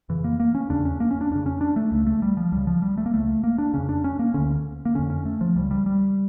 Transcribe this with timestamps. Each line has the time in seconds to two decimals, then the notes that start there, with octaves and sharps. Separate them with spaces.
0.09 F2 C#3 E3
0.24 A#3
0.40 A#3
0.55 C#4
0.70 E2 C#3 D4
0.85 C#4
1.00 A#3
1.11 C#4
1.21 D4
1.31 F2 C#3 D4
1.46 C#4
1.61 D4
1.76 A3
1.91 C#2 C#3 A3
2.07 A3
2.22 G3
2.37 F3
2.52 C#2 C#3 G3
2.67 F3
2.82 G3
2.98 A3
3.06 A#3
3.13 C#2 C#3 A3
3.44 A#3
3.58 D4
3.74 F2 C#3 C#4
3.89 D4
4.04 C#4
4.19 A#3
4.34 D2 D3 C#4
4.85 A#3
4.95 F2 D3 C#4
5.10 C#4
5.25 A3
5.41 F3
5.56 C#2 C#3 G3
5.71 G3
5.86 G3